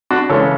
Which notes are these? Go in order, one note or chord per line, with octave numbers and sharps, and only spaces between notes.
D4 F#4
C#3 E3 G#3 A4 C#5